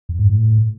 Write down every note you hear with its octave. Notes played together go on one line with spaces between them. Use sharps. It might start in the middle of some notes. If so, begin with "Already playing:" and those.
F2
G#2
A2